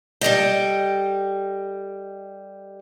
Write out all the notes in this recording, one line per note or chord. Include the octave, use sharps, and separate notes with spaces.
G3 A4 D#5 G5